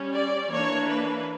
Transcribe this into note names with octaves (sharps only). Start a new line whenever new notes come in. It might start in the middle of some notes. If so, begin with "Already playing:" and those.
Already playing: G3 C#4
D5
E3 A#3 D4 C#5
B4